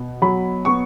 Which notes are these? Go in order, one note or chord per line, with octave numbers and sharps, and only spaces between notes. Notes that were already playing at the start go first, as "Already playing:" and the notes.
Already playing: B2 B3
F#3 B5
B3 C#6